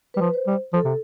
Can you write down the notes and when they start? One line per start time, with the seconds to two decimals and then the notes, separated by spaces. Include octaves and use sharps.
0.14 G3 B4
0.21 F3
0.34 C5
0.47 G3
0.73 F3 A4
0.85 C3